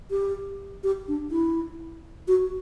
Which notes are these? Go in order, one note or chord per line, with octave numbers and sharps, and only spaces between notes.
G4
G4
D4
E4
F#4